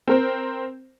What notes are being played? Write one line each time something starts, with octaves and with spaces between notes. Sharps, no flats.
C4 A#4 C5